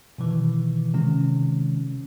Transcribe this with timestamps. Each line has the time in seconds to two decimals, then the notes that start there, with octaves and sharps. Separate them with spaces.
0.18 B2 D#3 E3
0.94 C3 D#3 G#3 C#4